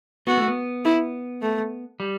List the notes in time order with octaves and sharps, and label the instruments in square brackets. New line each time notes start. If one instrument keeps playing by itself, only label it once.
[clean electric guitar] B3 [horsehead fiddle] F#4
[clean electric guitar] A3
B3
[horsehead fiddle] E4
A3
[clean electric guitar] G3